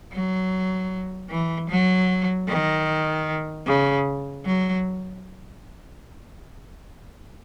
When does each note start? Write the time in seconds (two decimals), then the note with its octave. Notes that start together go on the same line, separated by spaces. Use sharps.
0.13 F#3
1.31 E3
1.70 F#3
2.49 D#3
3.67 C#3
4.45 F#3